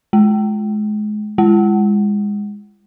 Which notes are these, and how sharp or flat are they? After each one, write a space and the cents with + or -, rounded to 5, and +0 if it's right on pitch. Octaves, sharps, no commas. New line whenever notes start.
G#3 +30
G#3 -20